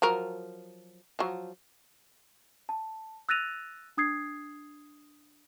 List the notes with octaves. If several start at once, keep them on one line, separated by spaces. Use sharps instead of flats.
F3 F#3 A#4
F3 F#3
A5
E6 F#6 A6 A#6 D#7 F7
D4 D#6 G#6 C7